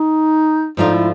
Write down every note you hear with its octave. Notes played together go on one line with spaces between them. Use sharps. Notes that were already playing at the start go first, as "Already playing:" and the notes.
Already playing: D#4
G#2 F3 A3 D4 D#4 F4
E4